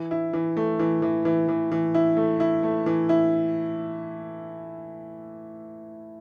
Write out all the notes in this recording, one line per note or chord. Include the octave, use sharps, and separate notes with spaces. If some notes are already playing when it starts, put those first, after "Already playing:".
Already playing: E3
E4
E3
A3
E3
E3
E3
E3
E3
E4
A3
E4
A3
E3
E4